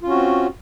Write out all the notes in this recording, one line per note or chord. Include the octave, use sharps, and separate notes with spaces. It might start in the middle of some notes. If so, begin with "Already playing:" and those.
C4 C#4 F4 F#4